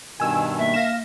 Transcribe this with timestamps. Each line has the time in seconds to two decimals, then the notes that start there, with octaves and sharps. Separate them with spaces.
0.20 G2 B2 D#3 G#5 E6
0.58 A#3 E5
0.74 F5 A#6 E7